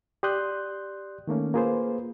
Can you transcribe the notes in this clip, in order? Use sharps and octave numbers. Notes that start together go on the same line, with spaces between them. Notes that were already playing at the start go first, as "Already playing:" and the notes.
G4 D5 C6 D#6 F#6 G6
D#3 A3 A#3 C#4
A#3 F4 G#4 B4 C5